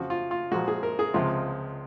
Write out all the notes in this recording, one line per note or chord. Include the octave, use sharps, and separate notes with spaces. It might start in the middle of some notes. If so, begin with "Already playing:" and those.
Already playing: F2 C#3 F3 F#4
F4
F4
A#2 F3 G#3 F#4
G#4
A#4
G#4
C#2 C3 F3 G#3 F4